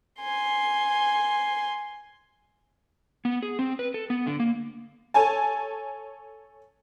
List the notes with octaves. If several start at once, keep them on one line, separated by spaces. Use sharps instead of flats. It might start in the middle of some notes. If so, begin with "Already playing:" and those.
G#5 C6
B3
G#4
C4
B4
A4
B3
D3
A#3
A4 C#5 G#5 A5